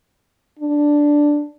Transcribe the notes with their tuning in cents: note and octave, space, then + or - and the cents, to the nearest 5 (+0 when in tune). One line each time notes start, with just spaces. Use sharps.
D4 +0